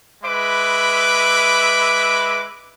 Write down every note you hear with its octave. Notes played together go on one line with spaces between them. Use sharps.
G#3 B4 E5 B5 D6